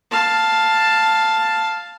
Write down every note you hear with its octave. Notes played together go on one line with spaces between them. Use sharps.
F5 A5